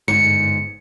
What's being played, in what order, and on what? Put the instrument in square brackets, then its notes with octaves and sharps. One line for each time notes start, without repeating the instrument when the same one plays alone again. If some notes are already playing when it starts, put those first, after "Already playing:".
[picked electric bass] G1 G#2 [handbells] C#7